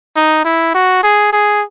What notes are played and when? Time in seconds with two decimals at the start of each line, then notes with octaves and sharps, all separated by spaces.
0.16 D#4
0.45 E4
0.74 F#4
1.03 G#4
1.33 G#4